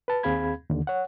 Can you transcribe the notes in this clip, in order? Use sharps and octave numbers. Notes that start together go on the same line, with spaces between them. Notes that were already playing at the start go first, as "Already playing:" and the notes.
B4 A5
D#2 C4 G#4 F5 B5 G#6
D#2 D3
C#5 F#5